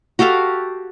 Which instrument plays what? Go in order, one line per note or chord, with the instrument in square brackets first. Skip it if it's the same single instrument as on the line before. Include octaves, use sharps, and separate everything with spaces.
[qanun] F#4 G4 A4 F5